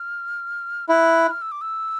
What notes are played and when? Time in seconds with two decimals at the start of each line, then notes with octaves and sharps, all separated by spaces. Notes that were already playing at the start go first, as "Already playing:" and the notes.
Already playing: F6
0.89 E4 F#6
1.31 F6
1.41 E6
1.52 D6
1.61 E6